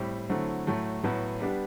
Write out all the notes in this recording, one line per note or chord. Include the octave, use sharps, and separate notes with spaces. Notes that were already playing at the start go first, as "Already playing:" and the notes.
Already playing: A2 G3 C4 G4
D3 F#3 A3 C4 E4
A2 F#3 A3
A2 F#3 B3
G3 B3 D4 G4